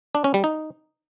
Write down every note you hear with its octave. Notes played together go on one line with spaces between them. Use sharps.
D4
C#4
G3
D#4